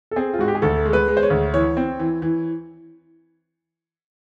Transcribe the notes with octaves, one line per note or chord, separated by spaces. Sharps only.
A4
C4 G#4
F4
G#2 F#4
G4
G#4
D2 A4
G#3
B4
G#3
C5
C#5
D2
E3 C#5
C4
E3
E3